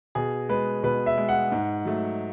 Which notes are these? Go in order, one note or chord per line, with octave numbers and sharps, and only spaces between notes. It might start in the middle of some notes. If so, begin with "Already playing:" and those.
B2 G#4
G#3 B4
B2 B4
E5
G#3
F#5
G#2
F#3 A3